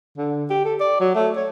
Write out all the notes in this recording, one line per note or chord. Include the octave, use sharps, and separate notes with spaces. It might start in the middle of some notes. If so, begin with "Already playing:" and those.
D3
G4
A4
D5
F#3
A3
C#5